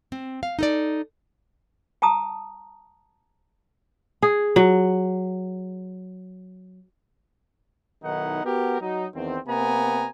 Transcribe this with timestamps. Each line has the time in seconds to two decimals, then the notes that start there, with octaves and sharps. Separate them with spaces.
0.12 C4
0.43 F5
0.59 D#4 A4 D5
2.02 G5 A5 A#5 D#6
4.23 G#4
4.56 F#3
8.04 B1 D#3 D#4 E4 F#5
8.45 B3 F#4 G4 A#4
8.81 F#3 D#4
9.14 E2 D#3 C4
9.48 C3 A#3 B3 G#5 A#5